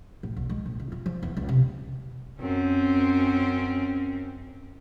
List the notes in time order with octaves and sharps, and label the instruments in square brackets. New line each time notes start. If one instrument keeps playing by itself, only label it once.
[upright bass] A2
B1
G#3
A#1
C#3
F4
F3
E2
C#2
C3
[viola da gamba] F#2 C4 C#4